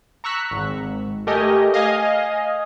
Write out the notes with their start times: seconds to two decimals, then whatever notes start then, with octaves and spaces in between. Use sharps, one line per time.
0.24 A#5 C#6 E6 F#6 B6
0.51 G#1
1.27 A3 G4 A#4 D#5 G#5
1.74 D#5 F5 G#5